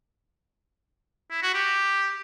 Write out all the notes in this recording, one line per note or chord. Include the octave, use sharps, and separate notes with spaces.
E4
F#4
G4